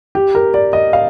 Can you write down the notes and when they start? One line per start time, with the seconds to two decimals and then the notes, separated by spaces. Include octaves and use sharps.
0.15 G4
0.35 A#4
0.54 D5
0.73 D#5
0.93 F5